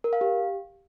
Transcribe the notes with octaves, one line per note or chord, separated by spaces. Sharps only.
A#4
F5
G4